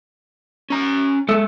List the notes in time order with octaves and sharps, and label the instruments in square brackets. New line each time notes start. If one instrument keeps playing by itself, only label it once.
[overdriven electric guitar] C#4 A#5
[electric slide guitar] G#3 A4 E5